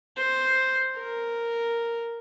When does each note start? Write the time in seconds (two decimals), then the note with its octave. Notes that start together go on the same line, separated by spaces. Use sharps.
0.17 C5
0.96 A#4